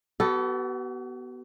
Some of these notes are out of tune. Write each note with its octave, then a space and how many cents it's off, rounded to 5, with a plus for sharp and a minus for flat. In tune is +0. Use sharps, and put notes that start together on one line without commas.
B3 +0 F#4 +45 A4 +0